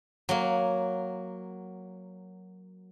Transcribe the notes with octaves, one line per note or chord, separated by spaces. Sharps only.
F#3 A#3